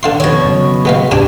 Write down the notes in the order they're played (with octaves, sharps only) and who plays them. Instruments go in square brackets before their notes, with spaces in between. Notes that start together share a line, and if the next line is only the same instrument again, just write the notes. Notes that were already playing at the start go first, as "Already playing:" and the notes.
[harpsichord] D3 F5 C6
[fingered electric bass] F2 D#3 [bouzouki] B2 C#5
[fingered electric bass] C#3 F#3
[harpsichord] G#3 B3 F5
[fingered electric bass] D#1 C#2 G#2 [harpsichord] C3 D4 G#5